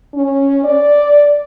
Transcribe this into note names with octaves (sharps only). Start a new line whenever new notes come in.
C#4
D5